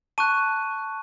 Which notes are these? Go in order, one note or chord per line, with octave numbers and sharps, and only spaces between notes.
A5 C#6 F#6 D#7